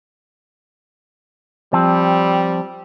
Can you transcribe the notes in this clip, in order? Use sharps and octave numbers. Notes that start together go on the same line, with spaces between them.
F3 G3 C4